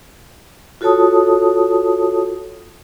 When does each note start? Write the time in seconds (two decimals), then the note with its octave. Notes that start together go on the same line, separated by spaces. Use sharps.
0.81 F4 F#4 A4 C#5 A5 D#6